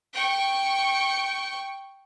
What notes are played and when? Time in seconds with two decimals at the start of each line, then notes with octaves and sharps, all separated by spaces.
0.13 G5 C#6